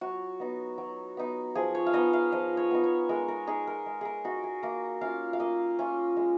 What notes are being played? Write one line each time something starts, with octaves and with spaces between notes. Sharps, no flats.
F#3 F#4
B3 D#4
F#3
B3 D#4
F3 G#4
C#5
F5
B3 D#4 D#5
F5
F3 D#5
C#5
B3 D#4
C#5
G#3 A#4
A#4
D#4 G#4
A#4
G#3
G#4 A#4
D#4 F#4
G#4
A#3 A#4
C#4 F4 F5
F5
A#3 D#5
C#4 F4
G#3